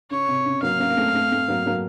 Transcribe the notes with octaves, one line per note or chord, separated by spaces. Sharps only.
C#3 C#5
C3
C#3
F#3 A#3 F5
A#3 C#4
A#3
A3 C4
A3 C4
A3 C4
F#3 A#3
F#3 A#3